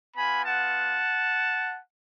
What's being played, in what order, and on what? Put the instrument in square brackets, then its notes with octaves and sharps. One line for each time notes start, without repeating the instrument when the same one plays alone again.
[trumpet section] B3 F4 G#5 B5
F#5 A5